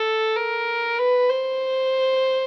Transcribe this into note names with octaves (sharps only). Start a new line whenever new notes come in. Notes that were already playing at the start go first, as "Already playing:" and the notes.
Already playing: A4
A#4
B4
C5